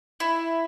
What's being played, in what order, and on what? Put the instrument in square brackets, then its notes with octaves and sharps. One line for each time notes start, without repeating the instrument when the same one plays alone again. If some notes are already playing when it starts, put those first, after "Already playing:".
[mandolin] E4